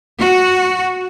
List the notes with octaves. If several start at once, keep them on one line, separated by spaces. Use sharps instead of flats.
F#4